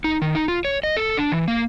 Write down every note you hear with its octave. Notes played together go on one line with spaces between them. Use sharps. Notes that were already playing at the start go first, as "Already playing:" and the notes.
D#4
D#3
D#4
F4
C#5
D#5
A4
D4
E3
A#3